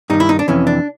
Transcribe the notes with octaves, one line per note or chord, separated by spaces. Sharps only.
G2 D#3 D#4
E4
D#4
D4
F2 C3 E3 C#4
D4